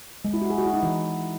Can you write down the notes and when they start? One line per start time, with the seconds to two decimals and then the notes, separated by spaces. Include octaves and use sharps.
0.25 G#3
0.34 E4
0.42 F#4
0.50 G#4
0.58 F#4
0.66 E4
0.74 D#4
0.83 E3